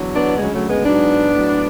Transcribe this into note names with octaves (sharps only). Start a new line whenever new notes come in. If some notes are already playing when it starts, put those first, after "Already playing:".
Already playing: E2 D3 F#3
B3 D4
D2 C#3 F#3 G#3
F#3 A3
G#3 B3
G#2 F#3 B3 D4
A2 F#3